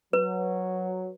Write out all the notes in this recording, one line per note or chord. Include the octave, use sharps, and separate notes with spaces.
F#3 B4